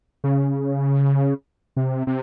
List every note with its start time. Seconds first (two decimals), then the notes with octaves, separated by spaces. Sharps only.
0.24 C#3
1.77 C3
2.07 C3